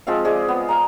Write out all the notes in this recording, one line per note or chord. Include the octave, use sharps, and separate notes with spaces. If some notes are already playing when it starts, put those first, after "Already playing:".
F3 G#3 C4 F5
G#4 D5 D#5
B3
F5 A#5